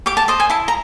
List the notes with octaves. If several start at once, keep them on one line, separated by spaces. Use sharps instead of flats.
G4 D6
A5
C5 D#5
G#5
E4 A5
A#5